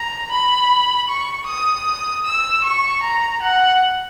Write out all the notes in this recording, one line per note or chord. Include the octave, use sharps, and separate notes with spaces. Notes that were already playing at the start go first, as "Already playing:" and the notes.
Already playing: A#5
B5
C#6
D#6
E6
C#6
A#5
F#5